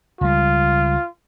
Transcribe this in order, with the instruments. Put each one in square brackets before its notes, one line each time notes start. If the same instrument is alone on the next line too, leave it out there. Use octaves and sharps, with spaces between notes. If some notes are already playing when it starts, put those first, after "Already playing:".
[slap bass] C#2 G3 [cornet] F4